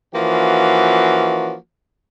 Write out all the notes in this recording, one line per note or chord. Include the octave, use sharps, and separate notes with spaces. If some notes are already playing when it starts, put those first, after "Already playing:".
E3 F3 A#3 C#4 F#4